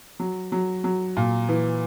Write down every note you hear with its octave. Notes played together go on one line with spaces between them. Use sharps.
F#3
F#3
F#3
A#2
E3